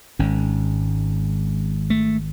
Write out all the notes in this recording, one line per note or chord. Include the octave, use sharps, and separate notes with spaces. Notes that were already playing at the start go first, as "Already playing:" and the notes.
G#1 G#2 C#4
A3